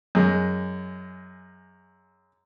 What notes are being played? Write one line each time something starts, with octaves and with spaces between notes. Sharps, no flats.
F#2 G#3